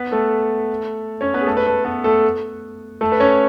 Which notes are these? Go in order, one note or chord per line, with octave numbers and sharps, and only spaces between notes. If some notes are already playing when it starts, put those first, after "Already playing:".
Already playing: B3 B4
A3 A4
C#4 C#5
B3 B4
G#4
A3 A4
B4
A3 A4
B3 B4
A3 A4
A3 A4
B4
C#4 C#5